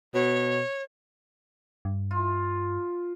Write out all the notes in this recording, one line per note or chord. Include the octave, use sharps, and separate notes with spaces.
B2 C#5
G2
F4